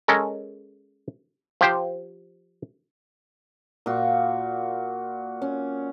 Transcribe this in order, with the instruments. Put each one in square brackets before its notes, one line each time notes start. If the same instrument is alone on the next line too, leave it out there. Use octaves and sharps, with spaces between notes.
[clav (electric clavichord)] G#3 C#4 A4 A#4
F3 G4 C5
[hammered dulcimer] A#2 F#4
C#4